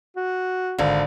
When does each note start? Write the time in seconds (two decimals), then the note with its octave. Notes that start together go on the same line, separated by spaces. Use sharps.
0.16 F#4
0.78 G#1 D3 F5